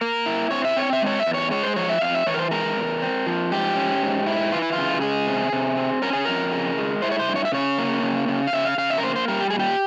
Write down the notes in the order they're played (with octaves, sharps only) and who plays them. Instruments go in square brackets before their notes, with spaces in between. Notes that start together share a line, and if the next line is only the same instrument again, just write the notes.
[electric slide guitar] A#3 A#4
E4
C4 C#5
E5
C4 C#5
E5
G#3 C#5
E5
E2
C#5
G#3 C#5
C5
F3 C#5
E5
F2 F5
E5
E3 C#5
A#4
C5
G#3 A#4
E2
C4
F3
G#2 G4
C#4
G#2
E4
E3 F4
E4
C#3 F4
G#3 G#4
C3
C3
C4
C#4 A#4
G#4
F2 A#4
C#3
G#3
E4 C5
C#5
C5
G2
C#5
E5
C#3 C#5
A#3
C#3
C#3
F5
C#3 E5
F5
C#3 F5
E5
A#4
A#3 C5
C5
G3 A#4
G4
A#2 G#4
G4